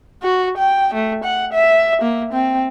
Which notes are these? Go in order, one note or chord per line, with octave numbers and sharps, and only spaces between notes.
F#4
G5
A3
F#5
E5
A#3
C4